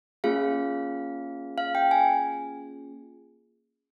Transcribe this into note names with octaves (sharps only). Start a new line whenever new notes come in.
A#3 C#4 F4 G#4 F5
F5
G5
G#5